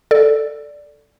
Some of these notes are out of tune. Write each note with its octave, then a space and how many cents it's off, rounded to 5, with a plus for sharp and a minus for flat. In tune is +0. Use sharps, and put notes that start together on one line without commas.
A4 +0 D5 +0